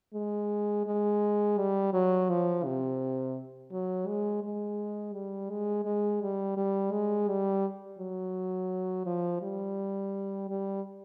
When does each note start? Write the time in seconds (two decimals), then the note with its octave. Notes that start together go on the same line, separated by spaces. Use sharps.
0.14 G#3
0.87 G#3
1.58 G3
1.93 F#3
2.29 F3
2.65 C3
3.72 F#3
4.07 G#3
4.43 G#3
5.14 G3
5.50 G#3
5.85 G#3
6.21 G3
6.57 G3
6.92 G#3
7.29 G3
7.99 F#3
9.06 F3
9.42 G3
10.49 G3